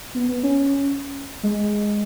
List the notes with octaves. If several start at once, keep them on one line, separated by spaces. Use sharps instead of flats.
B3
B3
C#4
G#3